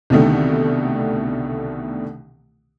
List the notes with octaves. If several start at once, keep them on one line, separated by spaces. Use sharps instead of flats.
C2 B2 D3 D#3 A3